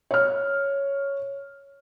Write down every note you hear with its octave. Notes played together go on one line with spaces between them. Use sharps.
C#5 F6